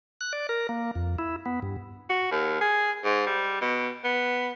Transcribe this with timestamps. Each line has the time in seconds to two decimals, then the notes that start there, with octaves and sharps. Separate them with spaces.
0.21 F#6
0.33 D5
0.49 A#4
0.69 A#3
0.95 F2
1.19 E4
1.46 B3
1.62 G2
2.10 F#4
2.31 D#2
2.61 G#4
3.05 G#2
3.27 G3
3.61 B2
4.04 B3